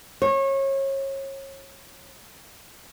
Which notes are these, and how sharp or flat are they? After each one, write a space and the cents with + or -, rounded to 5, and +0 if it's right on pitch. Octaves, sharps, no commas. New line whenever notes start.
C#5 -30